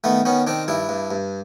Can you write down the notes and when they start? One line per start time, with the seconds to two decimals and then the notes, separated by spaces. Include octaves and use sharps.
0.04 D#3 A3 B3
0.25 D#3 B3 C#4
0.47 D#3 C4 D4
0.68 G2 D4 E4
0.89 G2
1.11 G2